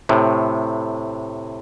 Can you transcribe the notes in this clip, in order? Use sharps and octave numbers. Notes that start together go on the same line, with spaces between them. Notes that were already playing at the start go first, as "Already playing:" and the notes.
A2 C3